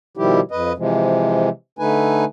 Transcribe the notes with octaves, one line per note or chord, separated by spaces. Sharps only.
B2 D#3 F3 G3 E4 G4
F2 B4 D#5
C3 E3 F3 G#3
D3 A3 D#4 B4 G#5